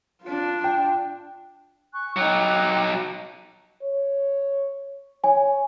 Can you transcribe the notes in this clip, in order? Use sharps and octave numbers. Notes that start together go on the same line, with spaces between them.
D4 F4
G5
G#5 C#6 F#6
F#3 D#4 G5 D6 F#6
C#5
C#5 G#5